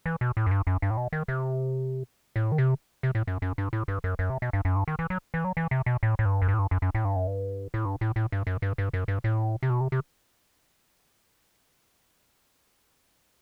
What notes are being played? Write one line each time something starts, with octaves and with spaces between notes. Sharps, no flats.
E3
B2
A2
F#2
G2
F#2
G2
A2
B2
D#3
C3
A2
D#3
C3
C3
A2
F#2
F#2
G2
A2
G2
F#2
F#2
C3
B2
G2
F#2
G2
D#3
E3
F#3
E3
F#3
E3
C3
B2
A2
A2
G2
F#2
G2
A2
G2
F#2
F#2
A2
G2
F#2
G2
A2
G2
A2
A2
G2
F#2
G2
G2
F#2
G2
A2
C3
B2
C3
C3